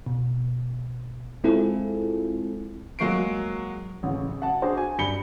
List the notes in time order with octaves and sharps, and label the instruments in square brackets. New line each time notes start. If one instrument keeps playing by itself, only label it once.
[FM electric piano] B2
G#3 C4 E4 F4 G#4 A4
[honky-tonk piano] F#3 G#3 A#3 C#6 C7 D7
[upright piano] A1 C#3
F#5 A5
D4 F#4 G#4 C5
G#5
G2 B5 C#7 G7